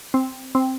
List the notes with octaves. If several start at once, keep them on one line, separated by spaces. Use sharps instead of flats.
C4
C4